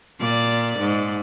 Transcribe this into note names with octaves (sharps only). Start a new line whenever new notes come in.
A#2 D5
G#2